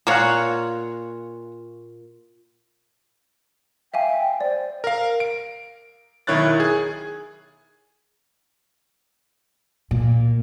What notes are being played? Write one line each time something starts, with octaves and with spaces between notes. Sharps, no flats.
A#2 A#3 F4 A#4 C#5 F#5
E5 F5 G5 G#5
C5 D5
A#4 F5
D7
B1 D#3 E4 C#5 F#6 A6
G#4 G#6
A#2